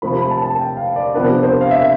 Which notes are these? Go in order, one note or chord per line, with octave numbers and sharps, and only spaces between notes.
C3 F3 A3 B5
B5
A5
A5
G5
F5
D5
C3 F3 B3 D4 B4
C5
F5
E5